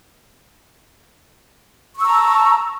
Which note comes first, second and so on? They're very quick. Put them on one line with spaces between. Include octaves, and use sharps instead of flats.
C#6 E6 A#5 A5